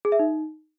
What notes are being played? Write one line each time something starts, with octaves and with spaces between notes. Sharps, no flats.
G#4
E5
D#4